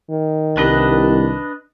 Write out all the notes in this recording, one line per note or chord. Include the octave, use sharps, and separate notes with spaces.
D#3
C2 D4 B4 D#5